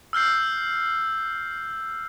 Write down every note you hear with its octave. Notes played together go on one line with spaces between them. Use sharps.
E6 F6 G6 C7